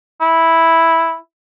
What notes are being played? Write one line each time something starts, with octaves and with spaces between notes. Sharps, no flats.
E4